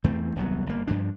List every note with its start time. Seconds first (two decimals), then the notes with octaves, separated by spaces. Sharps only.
0.04 E2 E3 A3 C4
0.36 D#1 C2 F#3 B3
0.66 G1 A#3
0.87 G2 F3 D4